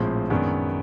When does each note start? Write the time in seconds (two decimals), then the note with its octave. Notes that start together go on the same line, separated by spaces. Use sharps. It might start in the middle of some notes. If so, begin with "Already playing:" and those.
Already playing: A#1 A2 F3 G#3 C4
0.30 F#2 D#3 G#3 B3 D4